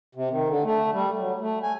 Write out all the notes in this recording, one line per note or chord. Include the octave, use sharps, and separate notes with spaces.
C3
D#3
D3
A3
G3
F#3
A3
G#5